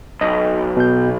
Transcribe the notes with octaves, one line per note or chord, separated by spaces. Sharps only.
B1 D#5
B2 G6